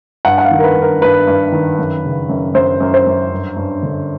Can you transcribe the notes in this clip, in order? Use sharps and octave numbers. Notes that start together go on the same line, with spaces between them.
G2 F#5
F#5
F5
D#3
A#4
B4
G2
A#4
G2 B4
G2
D#3
F#2
C#3
F#2
F#2 C5
F#2
C5
F#2
G2
G2
D3